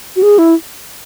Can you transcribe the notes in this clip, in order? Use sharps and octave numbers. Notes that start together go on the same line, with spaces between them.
F#4
G#4
E4